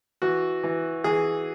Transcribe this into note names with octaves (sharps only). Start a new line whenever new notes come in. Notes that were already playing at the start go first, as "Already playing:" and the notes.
E3 F#4
E3
E3 G#4